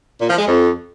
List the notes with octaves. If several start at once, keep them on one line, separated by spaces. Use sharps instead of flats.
A#2
F3
G#3
F2